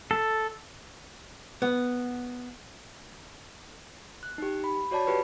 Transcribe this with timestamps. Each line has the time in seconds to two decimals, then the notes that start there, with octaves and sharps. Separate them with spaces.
0.11 A4
1.62 B3
4.23 F#6
4.38 D#4 G4
4.64 B5
4.91 F#4 C#5 D5 A5 B5
5.07 F4 G4 B4